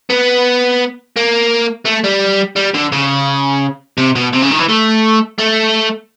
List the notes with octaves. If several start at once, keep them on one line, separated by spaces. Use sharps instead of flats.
B3
A#3
A3
G3
G3
D3
C#3
C3
B2
C3
C#3
D#3
E3
A3
A3